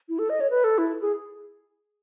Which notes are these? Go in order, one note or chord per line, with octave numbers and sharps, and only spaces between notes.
E4
A4
D#5
C#5
B4
A4
E4
G#4